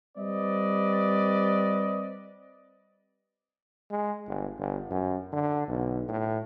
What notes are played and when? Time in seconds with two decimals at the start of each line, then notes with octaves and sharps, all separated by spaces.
0.18 G3 C4 B4 D5 D#5
3.91 G#3
4.28 G1
4.59 G1
4.91 F#2
5.33 D3
5.68 B1
6.08 A2